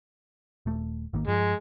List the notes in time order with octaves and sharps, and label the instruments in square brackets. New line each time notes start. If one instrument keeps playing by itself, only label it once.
[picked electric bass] D#1 A3
G#1 D#3 A#3
[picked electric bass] G2 F3 [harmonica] G#3